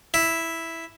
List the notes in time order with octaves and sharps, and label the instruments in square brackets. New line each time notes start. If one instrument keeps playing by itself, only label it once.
[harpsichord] E4